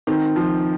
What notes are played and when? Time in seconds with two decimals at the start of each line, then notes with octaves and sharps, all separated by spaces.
0.07 D#3 C4
0.36 F3